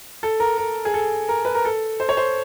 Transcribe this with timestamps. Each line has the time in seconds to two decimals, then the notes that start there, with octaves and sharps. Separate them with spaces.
0.23 A4
0.40 A#4
0.58 A#4
0.85 G#4
0.94 A4
1.29 A#4
1.45 B4
1.55 A#4
1.65 A4
2.00 C5
2.09 C#5
2.17 C5